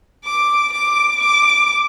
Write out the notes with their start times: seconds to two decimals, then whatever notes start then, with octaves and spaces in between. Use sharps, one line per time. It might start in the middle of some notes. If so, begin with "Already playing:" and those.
0.25 D6
0.73 D6
1.21 D6